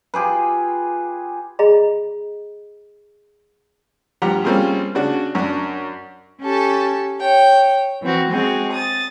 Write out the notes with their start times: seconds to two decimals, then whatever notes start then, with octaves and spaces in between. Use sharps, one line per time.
0.14 F4 G4 G#4 B4
1.59 G#4 D#5 A#5 B5
4.22 G2 F3 G4 F#5 A#5
4.44 G3 A#3 C4 C#4 F4 G#4
4.95 C#3 D4 F#4
5.35 F#2 D4
6.41 C#4 G4 A4 A5
7.20 C#5 G5
8.02 E3 C4 F#4
8.31 G#3 C4 F#4 G#4
8.72 D#6 A6